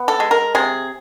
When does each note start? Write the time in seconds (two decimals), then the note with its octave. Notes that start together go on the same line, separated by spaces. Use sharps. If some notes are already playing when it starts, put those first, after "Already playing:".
Already playing: B3
0.08 A4
0.20 G#3
0.31 A#4
0.55 C3 G#4